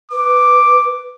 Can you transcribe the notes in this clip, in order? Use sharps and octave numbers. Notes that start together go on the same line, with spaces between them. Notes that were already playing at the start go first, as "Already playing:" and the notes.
B4 D6